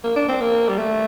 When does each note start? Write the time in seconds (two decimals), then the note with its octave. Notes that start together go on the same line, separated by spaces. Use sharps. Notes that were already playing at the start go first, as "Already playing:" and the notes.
0.04 A#3
0.16 D4
0.28 C4
0.41 A#3
0.69 G3
0.78 A3